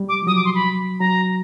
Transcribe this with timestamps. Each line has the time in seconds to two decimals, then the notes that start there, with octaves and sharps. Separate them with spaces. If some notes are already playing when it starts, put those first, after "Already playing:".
Already playing: G3
0.09 D6
0.23 F3
0.27 F#3 D#6
0.36 D6
0.45 C6
0.55 B5
1.00 F#3 A#5